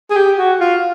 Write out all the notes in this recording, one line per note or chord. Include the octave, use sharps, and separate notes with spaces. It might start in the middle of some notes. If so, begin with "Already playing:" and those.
G#4
G4
F#4
F4